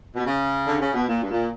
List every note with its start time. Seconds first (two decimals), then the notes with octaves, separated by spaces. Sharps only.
0.16 B2
0.25 C#3
0.67 D3
0.81 C#3
0.94 B2
1.09 A#2
1.23 G2
1.30 A#2